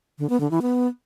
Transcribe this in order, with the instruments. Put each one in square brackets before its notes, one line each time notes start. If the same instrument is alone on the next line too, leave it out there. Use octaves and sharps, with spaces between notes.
[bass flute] D3
B3
D3
E3
B3